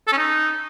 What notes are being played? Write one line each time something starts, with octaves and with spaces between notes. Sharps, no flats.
A4
C#4
D#4